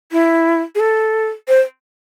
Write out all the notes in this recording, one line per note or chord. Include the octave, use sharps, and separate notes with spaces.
E4
G#4
A4
C5